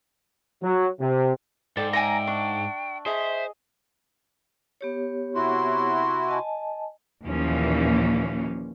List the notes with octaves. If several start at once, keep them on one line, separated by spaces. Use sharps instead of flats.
F#3
C3
G#2 A4 D5 G5 A5
E5 G5 G#5 A#5
D4 C#6
G#4 C5 D#5 E5
B3 G4 C#5
C3 E4 F#4 C6
D#5 G#5 A5
D#2 A#2 E3 F3 A#3 C#4